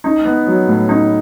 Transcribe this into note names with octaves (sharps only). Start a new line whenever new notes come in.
D#4
B3
F#3
A2
D#4